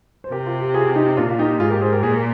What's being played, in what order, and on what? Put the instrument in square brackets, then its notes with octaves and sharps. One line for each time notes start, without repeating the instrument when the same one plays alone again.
[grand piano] C5
[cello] C3 [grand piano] G4 A#4
[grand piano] F4
G4
F4 G#4
D#4 G4
[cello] A#2 [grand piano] D4 F4
[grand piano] F4
D#4 G4
[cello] G#2 [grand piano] F4 G#4
[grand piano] G4 A#4
G#4 C5
G4 A#4
[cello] A#2 [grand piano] G#4
[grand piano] A#4